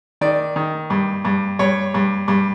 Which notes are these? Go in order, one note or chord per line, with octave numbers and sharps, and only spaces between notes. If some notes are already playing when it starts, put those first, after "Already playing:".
D#3 D5
D#3
G2
G2
G2 C#5
G2
G2